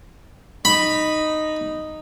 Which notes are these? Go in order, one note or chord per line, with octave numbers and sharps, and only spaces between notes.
D#4 B5